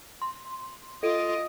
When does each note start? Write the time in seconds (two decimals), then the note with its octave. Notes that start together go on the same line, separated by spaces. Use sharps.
0.22 C6
1.03 F4 A4 D#5 D7 D#7